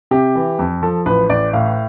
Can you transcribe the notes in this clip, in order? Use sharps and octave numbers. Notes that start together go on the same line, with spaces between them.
C3 G4
E3
F2
F3 A4
A1 B4
A1 D5
A2 F5